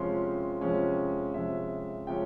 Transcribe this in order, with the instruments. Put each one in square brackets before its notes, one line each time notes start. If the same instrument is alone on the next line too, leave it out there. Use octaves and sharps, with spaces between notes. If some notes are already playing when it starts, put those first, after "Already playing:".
Already playing: [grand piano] F2 C3 F3 G#3 C#4 C6
F2 C3 F3 G#3 C#4
F2 C3 F3 G#3 C#4 E5
C3 F3 G#3 C#4 G5